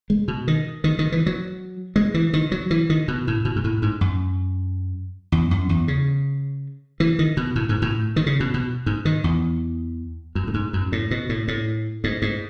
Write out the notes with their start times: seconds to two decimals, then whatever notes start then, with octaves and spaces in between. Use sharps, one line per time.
0.10 G#3
0.28 B2
0.48 D#3
0.84 D#3
0.99 D#3
1.12 E3
1.26 F#3
1.96 G#3
2.14 E3
2.34 D#3
2.52 F#3
2.71 E3
2.90 D#3
3.08 B2
3.27 A2
3.45 B2
3.56 G#2
3.64 A2
3.82 G#2
4.01 F#2
5.32 E2
5.51 F#2
5.69 E2
5.88 C#3
7.00 E3
7.19 D#3
7.37 B2
7.56 A2
7.69 G#2
7.82 A2
8.16 D#3
8.26 C#3
8.40 B2
8.54 B2
8.86 G#2
9.05 D#3
9.24 E2
10.35 F#2
10.47 A2
10.54 G#2
10.73 F#2
10.92 A2
11.11 B2
11.29 A2
11.48 A2
12.04 G#2
12.22 G#2